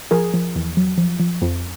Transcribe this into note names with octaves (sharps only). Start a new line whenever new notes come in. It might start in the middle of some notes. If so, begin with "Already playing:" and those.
F3 G#4 A#4
F3
E2
F#3
F3
F3
F2